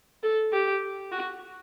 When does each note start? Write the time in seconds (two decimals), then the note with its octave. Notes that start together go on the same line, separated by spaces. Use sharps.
0.23 A4
0.52 G4
1.12 F#4